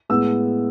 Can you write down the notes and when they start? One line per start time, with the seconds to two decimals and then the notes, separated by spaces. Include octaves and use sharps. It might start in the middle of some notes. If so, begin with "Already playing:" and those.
0.09 A2 G#3 B3 E6